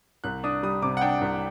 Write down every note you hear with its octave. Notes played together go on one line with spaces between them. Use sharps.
C2 F#6
D4 D#6
G3 D#6
C3 D6
F#5
D4 G5
C2